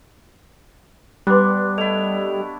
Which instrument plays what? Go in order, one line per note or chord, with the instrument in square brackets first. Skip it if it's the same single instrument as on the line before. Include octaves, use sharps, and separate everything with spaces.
[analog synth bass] G3 [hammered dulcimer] B3 D4 [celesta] C6 D6 F#6
[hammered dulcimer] A3 E4 [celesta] A4 D#5 F7